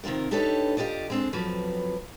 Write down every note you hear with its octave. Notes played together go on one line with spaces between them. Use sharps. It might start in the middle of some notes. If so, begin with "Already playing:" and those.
C3 D#3 C4 F4 A#4
D4 D#4 G4 A4 B4 C#5
F4 G4 B4 D5 D#5
G#3 C4 D4
F2 F3 F#3 B4